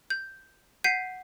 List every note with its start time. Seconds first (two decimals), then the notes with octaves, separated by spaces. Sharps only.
0.10 G6
0.84 F#5 G6 B6 C7 D#7